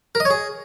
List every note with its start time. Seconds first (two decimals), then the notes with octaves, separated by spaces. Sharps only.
0.15 A#4
0.20 D#5
0.25 C#5
0.30 G#4